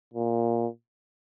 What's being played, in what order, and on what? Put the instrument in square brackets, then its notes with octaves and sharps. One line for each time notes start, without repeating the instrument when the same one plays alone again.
[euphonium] A#2